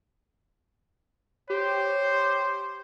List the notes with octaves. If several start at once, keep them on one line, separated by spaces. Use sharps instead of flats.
G4 C5 C#5